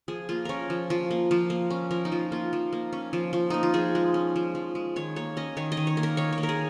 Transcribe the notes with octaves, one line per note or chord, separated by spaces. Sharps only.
F3 G#4
A#3 F4
C#4 A#4 C#5
F3
F3
A#3
F3
A#3
C#4
F3 A#4
D#4
F3 F4
A#3 F4
F3
A#3
C#4
F3
F3
A#3 D#4
F4
F3 G#4
G#3
C#4
F3
F3
G#3
D#3 C#5
A#3 C#5
C#4 D#5
D#3 C#5
D#5
D#3
C#5
A#3
A#4
D#3 C#5
C#5
A#3
A#4
G#4